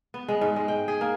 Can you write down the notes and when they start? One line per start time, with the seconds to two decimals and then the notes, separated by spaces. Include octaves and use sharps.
0.14 B3
0.28 G#3
0.41 G#2
0.56 G#3
0.68 G5
0.88 G#4
1.01 A#3